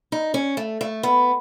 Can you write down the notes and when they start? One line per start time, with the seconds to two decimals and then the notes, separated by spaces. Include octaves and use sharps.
0.12 D#4
0.34 C#4
0.57 A3
0.81 A3
1.03 B3